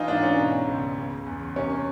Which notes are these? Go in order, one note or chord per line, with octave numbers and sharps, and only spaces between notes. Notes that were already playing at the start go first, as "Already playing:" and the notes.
Already playing: E3 D#4 F4
G#2 D4
C#4
B2
C#2
C#3
E2
C3 C#4